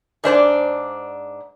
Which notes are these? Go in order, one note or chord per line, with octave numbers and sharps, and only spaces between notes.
G#2 D4 C5 D5